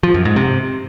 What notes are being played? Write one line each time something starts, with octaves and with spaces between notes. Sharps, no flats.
F3
F#2
G#2
C3